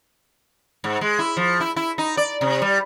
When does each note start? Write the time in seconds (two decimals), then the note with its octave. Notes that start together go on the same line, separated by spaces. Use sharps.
0.84 G#2
1.01 G#3
1.19 E4
1.37 F3
1.60 E4
1.76 E4
1.98 D#4
2.17 D5
2.41 C3
2.62 G3